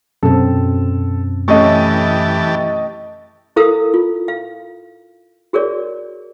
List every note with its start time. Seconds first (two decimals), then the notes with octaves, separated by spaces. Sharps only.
0.23 F#2 B2 C4 A4
1.48 E3 A3 C#4 G4 A4 D#5 A5 C#6
3.56 E4 A4 A#4 F5 D#6
3.94 F4
4.28 F5
5.53 F#4 G#4 A#4 C#5 D5